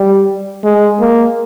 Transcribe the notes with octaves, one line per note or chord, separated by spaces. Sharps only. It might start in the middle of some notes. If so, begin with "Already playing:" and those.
Already playing: G3
G#3
A#3